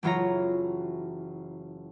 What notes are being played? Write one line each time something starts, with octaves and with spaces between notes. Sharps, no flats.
F#1 E3 F#3 F4 C#5 A#5